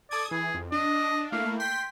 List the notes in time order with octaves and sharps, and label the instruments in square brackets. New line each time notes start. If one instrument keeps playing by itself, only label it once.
[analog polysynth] A4 D#6 G#6 [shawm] D5
[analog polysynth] E3 [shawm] G#4
[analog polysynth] F2
[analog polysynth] D4 [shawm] D#5
[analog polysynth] A3 A#3 E4 [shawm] F5
[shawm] G5 [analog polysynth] C6 B6